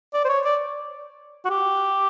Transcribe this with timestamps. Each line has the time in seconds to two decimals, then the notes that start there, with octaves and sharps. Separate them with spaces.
0.14 D5
0.25 C5
0.29 C#5
0.45 D5
1.45 F#4
1.50 G4